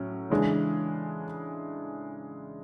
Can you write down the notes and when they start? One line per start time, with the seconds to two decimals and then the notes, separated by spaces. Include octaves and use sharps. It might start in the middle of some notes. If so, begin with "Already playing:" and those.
Already playing: A2 F#3 C#4
0.30 C#3 E3 G#3 D4 G#4